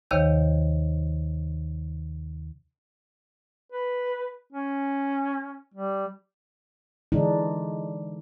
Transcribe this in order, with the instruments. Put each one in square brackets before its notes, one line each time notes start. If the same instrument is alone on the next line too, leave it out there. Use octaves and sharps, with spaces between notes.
[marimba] D#2 C3 D#3 C#5 F5 G6
[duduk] B4
C#4
G3
[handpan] D3 E3 G#3 D4 D#4